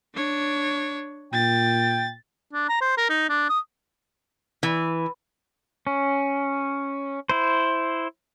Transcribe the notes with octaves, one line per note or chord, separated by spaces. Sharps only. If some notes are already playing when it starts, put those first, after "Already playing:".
D4 C#5
A#2 G5 A6
D4
A#5
C5
A#4
D#4
D4
D#6
E3
C#4
E4 C5